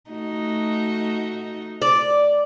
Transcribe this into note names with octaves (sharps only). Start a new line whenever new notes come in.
A3 D#4 F#4
D5